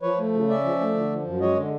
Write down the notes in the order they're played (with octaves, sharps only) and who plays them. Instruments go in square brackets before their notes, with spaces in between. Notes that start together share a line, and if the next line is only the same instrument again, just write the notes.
[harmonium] F3 B4 C#5
A3
C#3
C#4 D5 E5
F3
A3
D3
F3
F#2
G#3 C#5 D#5
D3